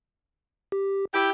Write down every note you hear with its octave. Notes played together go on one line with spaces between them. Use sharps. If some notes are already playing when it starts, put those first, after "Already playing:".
G4
E4 G4 G6